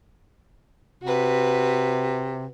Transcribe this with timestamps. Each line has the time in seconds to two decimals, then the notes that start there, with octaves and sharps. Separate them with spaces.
1.03 C3 F#4 B4